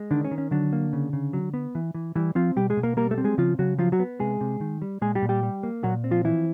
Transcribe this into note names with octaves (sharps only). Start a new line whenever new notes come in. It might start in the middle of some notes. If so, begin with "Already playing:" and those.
Already playing: G#3
D3 D#3 D4
C#4
D#3
C#4
D3 F#3 D4
A#3
C#3
C#3
F#3
B3
E3
E3
E3 G3 E4
F3 C4 F4
B2 G3 G4
G#3 G#4
B2
A#3 A#4
G3 A#3 A#4
A3 A4
C4
G#3 G#4
C#3 F3 F4
C#3 F#3 F#4
F3 F#3 F4
F#3 F#4
B3
C3 G#3 G#4
C3
D#3
G3
A#2 G#3 G#4
G3 G4
A#2
G3 G4
G3
A#3
A#2 F#3 F#4
C4
F3 F4
E3 F3 E4